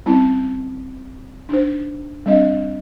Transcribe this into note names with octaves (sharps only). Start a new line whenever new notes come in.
G3 C4 C#4 E4 A5
D4 D#4 C5
G3 C4 D4 D#5 F5